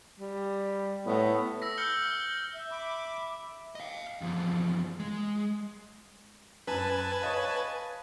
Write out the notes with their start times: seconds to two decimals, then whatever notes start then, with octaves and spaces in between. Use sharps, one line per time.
0.20 G3
1.06 A2 B3
1.62 E6 A#6 B6
1.78 E6 F6 G6 C#7 G7
2.55 E5
2.72 B5 D6
3.75 D#5 F5
4.21 E2 F3
5.00 G#3
6.67 F#2 B4 G#5 A5
7.21 C#5 D#5 F5